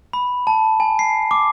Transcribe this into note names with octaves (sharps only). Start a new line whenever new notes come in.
B5
A5
G#5
C7
D6